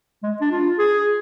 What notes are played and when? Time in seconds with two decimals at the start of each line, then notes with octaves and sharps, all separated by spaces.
0.23 G#3
0.41 D4
0.51 F4
0.78 G#4